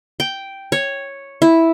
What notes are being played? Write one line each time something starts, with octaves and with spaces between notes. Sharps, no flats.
G5
C#5
E4